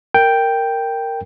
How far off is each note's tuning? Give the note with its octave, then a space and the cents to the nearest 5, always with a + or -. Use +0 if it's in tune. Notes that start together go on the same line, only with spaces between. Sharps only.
A#4 -10 G5 +0